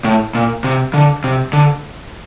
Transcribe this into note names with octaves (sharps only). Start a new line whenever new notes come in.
A2
A#2
C3
D3
C3
D3